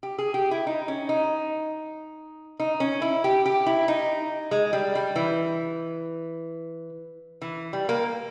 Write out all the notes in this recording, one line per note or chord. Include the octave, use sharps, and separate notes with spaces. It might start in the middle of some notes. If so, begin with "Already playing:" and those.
G4
G#4
G4
E4
D#4
C#4
D#4
D#4
C#4
E4
G4
G4
E4
D#4
G#3
G3
G3
E3
E3
G3
A#3